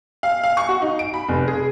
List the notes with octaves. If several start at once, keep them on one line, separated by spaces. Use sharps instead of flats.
F5
F5
C#6
F#4
D#4
D7
B5
F1
G#4